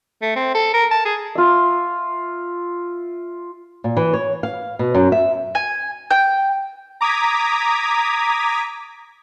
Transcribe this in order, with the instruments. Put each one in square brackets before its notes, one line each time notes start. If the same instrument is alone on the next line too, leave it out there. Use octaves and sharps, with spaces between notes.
[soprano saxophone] A3
C4
A4
A#4
A5
G#4
[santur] F4 E5
[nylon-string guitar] A#2
E3
C#5
F5
B2
F#2
E5
[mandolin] G#5
G5
[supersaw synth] A#5 D6 D#6 G#6 B6